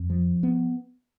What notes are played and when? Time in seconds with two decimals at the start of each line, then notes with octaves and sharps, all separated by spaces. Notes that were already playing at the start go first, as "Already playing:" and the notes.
Already playing: F2
0.10 F3
0.43 B3